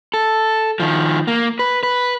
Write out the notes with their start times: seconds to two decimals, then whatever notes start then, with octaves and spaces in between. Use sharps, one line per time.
0.14 A4
0.80 D#3 F3
1.27 A#3
1.59 B4
1.83 B4